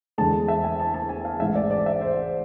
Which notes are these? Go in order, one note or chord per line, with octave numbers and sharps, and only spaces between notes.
E2 D3 G#3 A5
E5
G#5
A5
A5
G#5
F5
A1 G#2 G#3 E5
D5
D5
E5
C5